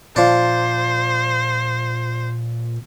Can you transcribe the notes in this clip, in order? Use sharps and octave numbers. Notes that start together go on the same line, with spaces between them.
A#2 F3 D4 C5